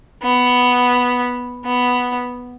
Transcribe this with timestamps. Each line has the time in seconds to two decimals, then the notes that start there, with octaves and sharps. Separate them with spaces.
0.23 B3
1.65 B3